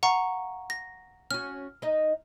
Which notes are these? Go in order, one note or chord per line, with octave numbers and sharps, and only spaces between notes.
F5 F#5 A#5 C#6
A#6
C#4 F#4 F6
D#4 D#5